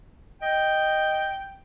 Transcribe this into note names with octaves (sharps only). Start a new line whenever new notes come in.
D#5 G5